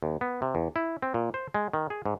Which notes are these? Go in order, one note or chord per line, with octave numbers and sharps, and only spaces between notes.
D#2
B3
C3
E2
E4
C4
A#2
C5
G#3
D#3
G#4
G#2